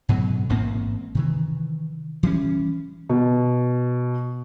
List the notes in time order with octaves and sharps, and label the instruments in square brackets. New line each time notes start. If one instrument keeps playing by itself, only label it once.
[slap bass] G#2 B2 D3 F#3
A1 G#2 A#3 C4
C3 D#3 E3
E3 G3 C#4
[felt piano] B2